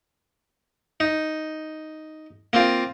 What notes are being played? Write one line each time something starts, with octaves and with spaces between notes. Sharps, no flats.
D#4
A#3 C4 F4